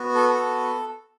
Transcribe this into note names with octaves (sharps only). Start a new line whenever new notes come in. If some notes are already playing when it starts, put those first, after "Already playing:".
Already playing: B3 F#4
A4
A4